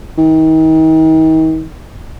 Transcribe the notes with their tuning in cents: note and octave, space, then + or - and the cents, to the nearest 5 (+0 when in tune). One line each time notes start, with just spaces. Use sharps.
D#3 +40